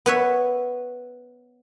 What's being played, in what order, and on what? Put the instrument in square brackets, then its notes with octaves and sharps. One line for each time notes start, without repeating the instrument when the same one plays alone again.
[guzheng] B3 B4 C#5 E5